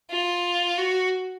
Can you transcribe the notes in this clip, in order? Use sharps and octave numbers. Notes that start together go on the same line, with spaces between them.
F4
F#4